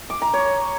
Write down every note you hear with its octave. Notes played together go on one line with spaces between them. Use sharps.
D6
A#5
C#5